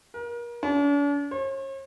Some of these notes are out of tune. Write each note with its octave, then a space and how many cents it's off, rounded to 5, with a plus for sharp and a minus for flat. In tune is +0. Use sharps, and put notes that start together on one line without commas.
A#4 +35
D4 -45
C#5 -45